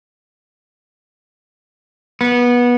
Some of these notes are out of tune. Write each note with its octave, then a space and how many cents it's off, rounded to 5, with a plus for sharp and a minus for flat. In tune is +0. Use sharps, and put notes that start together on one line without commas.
B3 -20